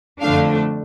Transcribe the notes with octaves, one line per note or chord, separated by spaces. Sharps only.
F2 D3 A3 D4 F5